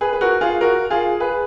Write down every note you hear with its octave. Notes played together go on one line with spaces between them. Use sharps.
G#4 B4
B4
F#4 A#4
F4 G#4
F#4 A#4
F4 G#4
G#4 B4